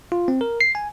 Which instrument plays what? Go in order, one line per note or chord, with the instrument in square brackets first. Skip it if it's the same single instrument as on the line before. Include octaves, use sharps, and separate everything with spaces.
[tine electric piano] F4
C4
A#4
C7
G#5